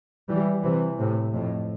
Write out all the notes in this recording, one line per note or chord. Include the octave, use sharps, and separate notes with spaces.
E3 G3
C3 E3
A2 C3
F2 A2